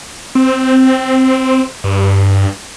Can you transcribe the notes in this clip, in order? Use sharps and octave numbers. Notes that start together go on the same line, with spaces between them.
C4
G2